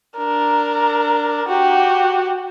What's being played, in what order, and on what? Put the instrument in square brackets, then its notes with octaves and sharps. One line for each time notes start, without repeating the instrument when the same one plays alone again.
[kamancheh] D4 A#4
F#4 G4